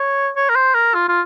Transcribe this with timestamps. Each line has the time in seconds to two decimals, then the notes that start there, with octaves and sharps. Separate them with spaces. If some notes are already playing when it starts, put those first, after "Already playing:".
Already playing: C#5
0.36 C#5
0.49 A#4
0.55 C5
0.74 A#4
0.94 F4
1.08 F4